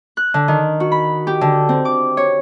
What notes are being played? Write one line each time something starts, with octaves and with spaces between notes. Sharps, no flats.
F#6
D3
D#3
F#4
B5
G4
D3
C4
D6
C#5